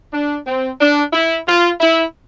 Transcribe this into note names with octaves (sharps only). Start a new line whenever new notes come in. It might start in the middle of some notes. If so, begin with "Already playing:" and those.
D4
C4
D4
E4
F4
E4